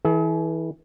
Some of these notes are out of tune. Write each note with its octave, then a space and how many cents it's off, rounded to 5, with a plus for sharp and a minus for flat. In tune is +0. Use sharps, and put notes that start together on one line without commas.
E3 -25 G#4 +45